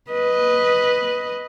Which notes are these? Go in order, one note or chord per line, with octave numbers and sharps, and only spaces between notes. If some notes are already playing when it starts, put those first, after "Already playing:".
B4 D#5